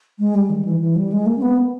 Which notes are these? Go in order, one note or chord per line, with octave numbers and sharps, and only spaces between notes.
G#3
G3
D#3
E3
E3
G3
G#3
A#3
C#4
B3